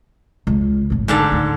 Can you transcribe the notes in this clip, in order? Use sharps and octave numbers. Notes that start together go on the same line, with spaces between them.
C#2
G#1 A2
G#2 D3 A5
D2